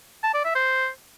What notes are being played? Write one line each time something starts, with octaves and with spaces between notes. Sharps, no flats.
A5
D5
E5
C5